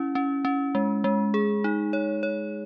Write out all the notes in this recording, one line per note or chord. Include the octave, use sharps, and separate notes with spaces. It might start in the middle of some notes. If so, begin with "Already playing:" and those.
Already playing: C#4 E4
C#4
C#4
G#3
G#3
G#4
D#4
C#5
C#5